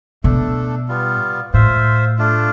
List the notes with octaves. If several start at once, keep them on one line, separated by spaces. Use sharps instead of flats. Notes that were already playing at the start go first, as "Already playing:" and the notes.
B2 A3 D4 A4
G3 B3 F4
A2 F4 C5 E5
A3 D4 F4